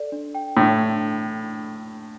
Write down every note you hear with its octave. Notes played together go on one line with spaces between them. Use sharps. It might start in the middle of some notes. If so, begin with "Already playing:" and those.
Already playing: A4 D5
D4
G5
A2 D4
D4